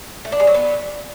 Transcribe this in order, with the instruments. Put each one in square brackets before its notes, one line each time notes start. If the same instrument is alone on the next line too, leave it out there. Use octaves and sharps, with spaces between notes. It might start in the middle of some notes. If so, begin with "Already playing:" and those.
[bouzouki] A3
D4
G#3
F#3
B3